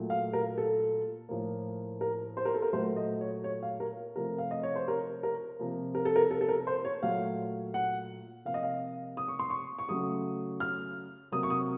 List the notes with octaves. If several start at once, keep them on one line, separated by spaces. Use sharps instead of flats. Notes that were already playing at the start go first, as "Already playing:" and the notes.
Already playing: A#2 F#3 A3
F5
A#4
A4
A2 F3 A#3
A#4
C5
A#4
A4
A#4
A#2 F#3 A3 C5
D#5
C#5
C#5
F5
A#4
C3 F3 A3 A#4
F5
D#5
C#5
C5
A#4
A#4
C3 F3 A#3
A#4
A4
A#4
A4
A4
A#4
C5
C#5
A#2 F#3 A3 F5
F#5
C3 F3 A#3 F5
D#5
F5
D#6
C#6
C6
C#6
C#6
C#3 F#3 A3 D#6
F6
C3 F#3 A#3 D#6
C#6
D#6